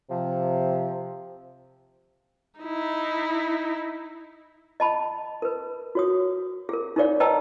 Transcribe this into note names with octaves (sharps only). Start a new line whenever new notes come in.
C3 F3
D#4 E4
D#5 A5 B5
A#4 B4
F#4 C#5 D#6
G#4 A#4
D#4 G#4 A#4 C#5 D5 F5
B4 D#5 G5 A5 A#5 E6